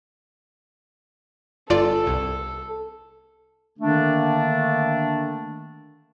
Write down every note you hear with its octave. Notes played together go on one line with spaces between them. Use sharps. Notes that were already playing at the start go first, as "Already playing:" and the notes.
G1 F4 A4 D5
C2
D3 D#3 A3 A#3 D4